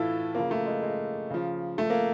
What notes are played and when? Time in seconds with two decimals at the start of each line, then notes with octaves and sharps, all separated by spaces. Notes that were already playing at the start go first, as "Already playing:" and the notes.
Already playing: A2 E3 E4 F4 A4
0.35 C#3 F3 A#3
0.51 A3
0.66 G#3
0.82 G#3
1.30 C#3 F3
1.78 A3
1.90 A#3